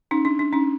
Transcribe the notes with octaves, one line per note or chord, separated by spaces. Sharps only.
C#4 D#4
D4
D4
C#4 D#4